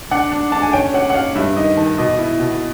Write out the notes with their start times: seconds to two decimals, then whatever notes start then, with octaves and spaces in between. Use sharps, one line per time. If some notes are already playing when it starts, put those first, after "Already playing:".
0.11 D4 F#5
0.32 D4
0.52 D4 A5
0.62 G#5
0.73 C#4 G5
0.94 C#4 F#5
1.10 F#5
1.14 C#4 F5
1.35 G2 E5
1.56 D#3 D#5
1.77 D#3 A5
1.98 B2 D#5
2.18 E4
2.40 B2